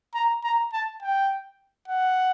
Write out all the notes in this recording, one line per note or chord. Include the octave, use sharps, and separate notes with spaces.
A#5
A#5
A5
G5
F#5